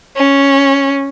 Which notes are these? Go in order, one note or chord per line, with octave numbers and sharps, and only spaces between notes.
C#4